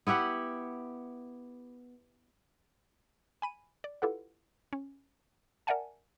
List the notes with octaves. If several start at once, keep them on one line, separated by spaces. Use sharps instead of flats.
B3 E4 G4 F#5
G#5 B5 D#7
D5
E4 F4 G4 A4 B4 F#5
C#4
A#4 D5 E5 F#5 G#5 A5